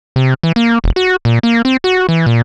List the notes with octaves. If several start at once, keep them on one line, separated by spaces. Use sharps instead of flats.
C3
E3
A#3
E1
F#4
A#2
A#3
C4
F#4
E3
A#2